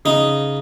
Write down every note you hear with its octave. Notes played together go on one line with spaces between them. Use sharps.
C#3 D#4